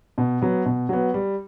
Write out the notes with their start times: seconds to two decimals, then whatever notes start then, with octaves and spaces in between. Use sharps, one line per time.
0.18 B2
0.42 F#3 B3
0.66 B2
0.89 F#3 B3
1.14 G3